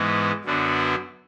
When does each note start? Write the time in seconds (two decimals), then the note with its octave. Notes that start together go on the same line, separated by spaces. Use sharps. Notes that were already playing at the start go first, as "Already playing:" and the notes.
Already playing: G#2 E3 G#3 B3
0.45 F#2 D3 F#3 B3 D4